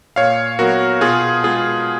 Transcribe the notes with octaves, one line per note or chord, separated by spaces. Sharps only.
A#2 C#5 F5
F#3 B3 F#4 A#4
B2 F4 G#4
G#3 B3 F4 G#4